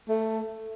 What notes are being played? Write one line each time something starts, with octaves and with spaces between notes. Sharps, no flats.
A3